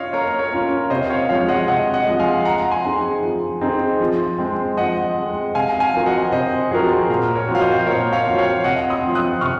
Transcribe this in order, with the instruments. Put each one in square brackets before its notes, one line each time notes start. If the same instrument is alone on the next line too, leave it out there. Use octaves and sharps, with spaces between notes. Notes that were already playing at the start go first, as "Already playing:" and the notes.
Already playing: [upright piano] C#4 F4 [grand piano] C#5 D#5 F5
[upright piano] A#3 [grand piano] A#4 C#5
[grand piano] A#4 C#5
[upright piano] C#4 F4
[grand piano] A#4
[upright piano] C3 [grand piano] C5 D#5
[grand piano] C#5 F5
[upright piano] F3 G#3 [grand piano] C#5 F5
[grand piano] D#5 F#5
[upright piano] C3 [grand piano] D#5 F#5
[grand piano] D#5 F#5
[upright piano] F3 G#3
[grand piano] F5 G#5
[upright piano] F3 [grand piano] F#5 A#5
[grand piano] G#5 C6
[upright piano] C4 D#4 G#4
F3
C4 D#4 G#4
F3
G#3 C4
[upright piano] F3 [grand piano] D#5 F#5
[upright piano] G#3 C4
[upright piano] C3 [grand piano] F5 G#5
[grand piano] F5 G#5
[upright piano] F3 C4 F#4 A#4
[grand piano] D#5 F#5
[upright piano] C3 [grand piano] C5 D#5
[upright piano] F3 C4 F#4 A#4 [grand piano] G#4
[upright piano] A#2 [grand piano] A#4
[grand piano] A#4 C#5
[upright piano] F3 C4 F#4
[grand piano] F5
C5 D#5
[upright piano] A#2 [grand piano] A#4 C#5
[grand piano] C#5 F5
[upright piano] F3 C4 F#4
[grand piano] C#5 F5
[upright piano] C3 [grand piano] D#5 F#5
[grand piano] C6 D#6
[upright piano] F3 C4
[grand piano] D#6 F#6
[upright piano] C3 [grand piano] C#6 F6